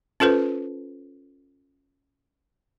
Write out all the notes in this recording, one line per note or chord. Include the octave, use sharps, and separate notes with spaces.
C#4 F4 A4 B4 C5